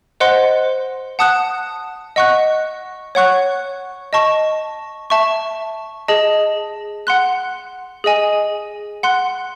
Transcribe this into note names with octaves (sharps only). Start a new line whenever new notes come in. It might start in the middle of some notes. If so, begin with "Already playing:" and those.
C5 D#5 F#5 C6 F#6
F#5 A5 D#6 F#6
D#5 F#5 C#6 F#6
C#5 F#5 C#6 F#6
D#5 A5 C#6
E5 A5 C#6
G#4 D#5 A5
F#5 C6 F#6
G#4 D#5 G#5
F#5 C6 F#6